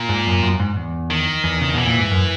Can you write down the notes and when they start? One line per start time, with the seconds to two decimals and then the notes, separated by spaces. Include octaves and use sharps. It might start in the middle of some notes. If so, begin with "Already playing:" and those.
Already playing: A#2
0.09 G#2
0.27 F#2
0.43 F#2
0.60 G#2
0.76 E2
1.10 D#3
1.44 E2
1.61 C#3
1.74 B2 E3
1.87 A#2
1.98 G#2
2.11 F#2